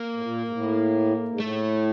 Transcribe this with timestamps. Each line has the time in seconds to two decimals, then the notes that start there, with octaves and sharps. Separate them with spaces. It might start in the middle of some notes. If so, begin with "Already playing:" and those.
Already playing: A#3
0.13 A2
0.22 A#2
0.48 G#2
0.52 A2
1.28 G#2
1.39 A2 A3